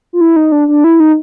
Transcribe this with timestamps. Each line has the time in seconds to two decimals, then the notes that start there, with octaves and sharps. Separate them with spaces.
0.13 F4
0.21 E4
0.36 D#4
0.52 D4
0.68 D4
0.84 E4
1.00 D#4